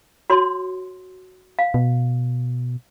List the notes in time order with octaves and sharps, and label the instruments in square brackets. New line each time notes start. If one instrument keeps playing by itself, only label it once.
[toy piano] F#4 C#5 C6
F5
[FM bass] B2